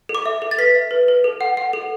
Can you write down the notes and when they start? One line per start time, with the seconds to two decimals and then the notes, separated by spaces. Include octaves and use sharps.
0.09 A4
0.15 D6
0.26 E5
0.42 A4
0.51 A6
0.58 B4 B6
0.75 E5
0.91 B4
1.08 B4
1.24 A4
1.41 F#5
1.57 F#5
1.73 A4